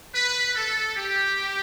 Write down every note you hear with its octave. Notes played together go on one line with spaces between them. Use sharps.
B4
A4
G4